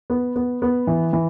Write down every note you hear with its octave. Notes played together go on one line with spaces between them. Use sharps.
B3
B3
B3
E3
E3